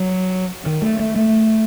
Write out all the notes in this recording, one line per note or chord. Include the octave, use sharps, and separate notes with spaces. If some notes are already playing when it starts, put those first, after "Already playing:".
Already playing: F#3
D#3
A3
A3
A3